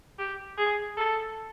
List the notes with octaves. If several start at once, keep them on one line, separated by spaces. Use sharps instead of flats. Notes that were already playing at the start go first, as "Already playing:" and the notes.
G4
G#4
A4